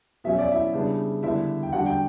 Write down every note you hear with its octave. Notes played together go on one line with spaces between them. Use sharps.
B2 F#3 C#4 E5
D5
E4 E5
C#3 G3 B3 D4
D3 G3 B3 D4 E4 E5
G5
D3 G3 D4 F#4 F#5
G5